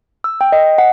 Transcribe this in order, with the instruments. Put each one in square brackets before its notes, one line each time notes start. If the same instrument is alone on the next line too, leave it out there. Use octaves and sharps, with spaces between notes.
[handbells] E6
G5
D#5
F#5